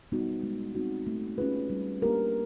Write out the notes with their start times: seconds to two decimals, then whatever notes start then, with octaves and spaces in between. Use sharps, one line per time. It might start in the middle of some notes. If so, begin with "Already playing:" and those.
0.12 G3 B3 D#4 F#4
0.43 G#3
0.75 C4 D#4 F#4
1.07 A3
1.38 C#4 F4 G#4 B4
1.70 G3
2.02 A#3 D4 G4 A#4